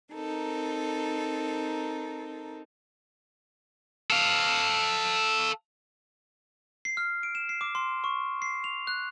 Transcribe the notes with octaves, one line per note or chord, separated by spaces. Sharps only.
C4 D#4 A4 A#4
A4 F5
C7
F6
D7
E7
C7
D6
C6
C#6
C7
F7
F#6